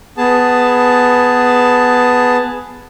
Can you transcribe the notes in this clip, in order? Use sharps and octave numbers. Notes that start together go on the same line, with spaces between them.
B3 G#4 A5